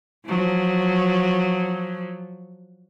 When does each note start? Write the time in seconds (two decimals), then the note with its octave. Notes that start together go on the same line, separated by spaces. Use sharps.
0.26 F3 F#3